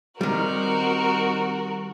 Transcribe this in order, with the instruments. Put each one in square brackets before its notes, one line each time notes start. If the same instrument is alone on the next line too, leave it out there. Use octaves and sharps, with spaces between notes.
[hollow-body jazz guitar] D#3 G3 [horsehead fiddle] C4 D#4 [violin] F#4 A#4